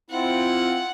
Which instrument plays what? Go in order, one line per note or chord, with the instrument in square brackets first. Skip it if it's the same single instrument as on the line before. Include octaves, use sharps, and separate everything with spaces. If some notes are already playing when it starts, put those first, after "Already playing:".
[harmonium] C4 E4 F4 [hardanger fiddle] F#5